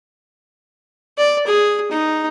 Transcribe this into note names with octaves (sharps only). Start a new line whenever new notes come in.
D5
G#4
D#4